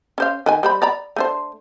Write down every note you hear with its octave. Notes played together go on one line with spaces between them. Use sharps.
C#4 C5 F5
D#3 B4 G#5
G3 C5 B5
D5 A#5 B5
A3 D4 C5